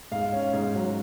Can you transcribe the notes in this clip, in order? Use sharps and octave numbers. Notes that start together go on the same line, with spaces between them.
G#2 F5
C#4
G#2
F#3